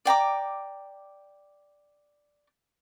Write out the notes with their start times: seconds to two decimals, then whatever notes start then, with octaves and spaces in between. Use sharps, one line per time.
0.05 D5 G5 A#5 D6